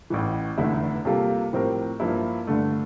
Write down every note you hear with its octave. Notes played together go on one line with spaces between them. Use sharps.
A1 A2 E3
F1 E2 D3 A3 E4
C3 G3 A#3 F4 A4
A2 F3 C4 G4 A#4
G2 F3 A#3 E4
G2 D3 A3